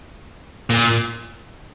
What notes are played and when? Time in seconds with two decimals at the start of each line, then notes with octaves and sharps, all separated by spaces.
0.70 A#2